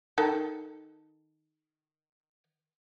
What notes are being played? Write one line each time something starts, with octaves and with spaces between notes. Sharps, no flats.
D#3 A4